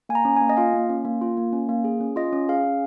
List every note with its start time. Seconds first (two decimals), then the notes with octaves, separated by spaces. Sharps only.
0.09 A#3 G#5
0.15 A#5
0.25 C#4
0.36 G#5
0.41 A#3
0.49 D#5
0.57 F4 F5
0.74 A#3
0.90 C#4
1.05 A#3
1.21 F4
1.37 A#3
1.53 C#4
1.69 A#3
1.84 G#4
2.00 C#4
2.16 F4 D#5
2.33 C#4
2.49 G#4 F5
2.64 C#4